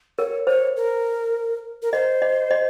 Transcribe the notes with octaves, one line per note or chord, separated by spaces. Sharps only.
A#4 C#5
C5 C#5
A#4
A#4
C5 D#5
D#5
D#5